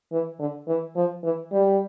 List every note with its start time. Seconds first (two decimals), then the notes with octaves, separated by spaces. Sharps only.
0.12 E3
0.39 D3
0.68 E3
0.96 F3
1.23 E3
1.52 G3